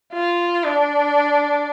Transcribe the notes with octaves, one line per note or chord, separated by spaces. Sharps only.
F4
D4